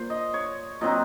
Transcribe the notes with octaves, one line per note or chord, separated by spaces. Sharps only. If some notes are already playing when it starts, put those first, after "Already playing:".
Already playing: A#2 C5
D#5
C#5
A#2 F#3 C4 D#4 D#5